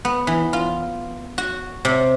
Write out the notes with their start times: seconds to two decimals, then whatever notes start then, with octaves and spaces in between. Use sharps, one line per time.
0.05 B3
0.27 E3
0.53 F4
1.38 F#4
1.85 C3